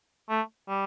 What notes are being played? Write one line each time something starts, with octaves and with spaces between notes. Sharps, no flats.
A3
G3